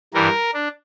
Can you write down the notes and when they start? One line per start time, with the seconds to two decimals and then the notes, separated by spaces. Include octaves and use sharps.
0.14 G2 E3 G3 A#4
0.54 D4